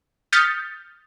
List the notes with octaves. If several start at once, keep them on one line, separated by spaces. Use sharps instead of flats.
D#6 F6 G6 A6 B6 C#7